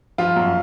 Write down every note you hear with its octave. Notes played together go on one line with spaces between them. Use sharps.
F3 F4
F#2